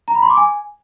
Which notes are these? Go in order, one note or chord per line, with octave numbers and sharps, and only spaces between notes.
A#5
B5
C6
D6
G#5